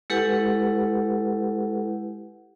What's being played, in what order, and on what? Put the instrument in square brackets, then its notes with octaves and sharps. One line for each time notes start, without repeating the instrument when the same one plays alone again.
[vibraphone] G#3 E4 G4 A4 B4 F#5